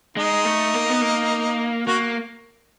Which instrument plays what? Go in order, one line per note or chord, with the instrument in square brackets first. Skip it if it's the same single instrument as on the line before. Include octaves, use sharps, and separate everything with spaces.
[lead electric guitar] G#3 [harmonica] D#4
[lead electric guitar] A3
A#3
B3
A#3
[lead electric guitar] A#3 [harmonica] F#4